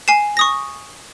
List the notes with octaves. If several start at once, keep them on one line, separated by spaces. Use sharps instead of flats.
G#5 C7 E7
C#6 D#6 A#6